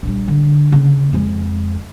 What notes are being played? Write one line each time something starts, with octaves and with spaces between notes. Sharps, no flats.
A#1 G3
D3
C#3 A#3
F2 G#3